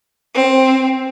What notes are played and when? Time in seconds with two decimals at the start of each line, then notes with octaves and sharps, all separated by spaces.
0.35 C4